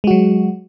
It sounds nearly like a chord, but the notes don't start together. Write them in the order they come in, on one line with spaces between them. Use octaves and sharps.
G#3 F#4 F#3